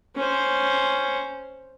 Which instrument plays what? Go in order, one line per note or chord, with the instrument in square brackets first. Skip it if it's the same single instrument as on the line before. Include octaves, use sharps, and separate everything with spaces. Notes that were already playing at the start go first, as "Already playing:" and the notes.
[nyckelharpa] C#4 C5